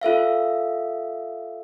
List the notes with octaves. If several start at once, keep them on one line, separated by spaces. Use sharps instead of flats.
F4 A4 E5 F5